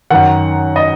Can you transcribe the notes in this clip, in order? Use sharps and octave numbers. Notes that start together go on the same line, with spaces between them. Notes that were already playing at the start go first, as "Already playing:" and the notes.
F#2 D#3 F#5
D#5